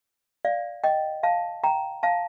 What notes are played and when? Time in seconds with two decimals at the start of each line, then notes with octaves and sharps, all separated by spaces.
0.45 D5 F5
0.84 D#5 G5
1.23 F5 A5
1.64 G5 A#5
2.03 F5 A5